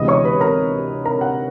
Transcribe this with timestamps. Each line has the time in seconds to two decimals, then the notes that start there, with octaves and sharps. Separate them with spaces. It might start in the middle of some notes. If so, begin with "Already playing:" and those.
Already playing: D2 C3 E3 G#3 B3 D#5 D#6
0.08 C#5 C#6
0.24 B4 B5
0.40 A#4 A#5
1.05 A#4 A#5
1.21 F#5